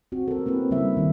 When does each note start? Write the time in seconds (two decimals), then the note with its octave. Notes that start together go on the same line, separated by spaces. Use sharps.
0.12 C4 F#4
0.28 A4 A#4
0.46 A#3 C4 E4 B4
0.71 C#3 G3 A#3 E4 E5
0.97 D#3 G3 D#4